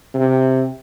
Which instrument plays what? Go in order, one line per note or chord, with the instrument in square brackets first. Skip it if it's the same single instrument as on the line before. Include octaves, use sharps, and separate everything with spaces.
[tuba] C3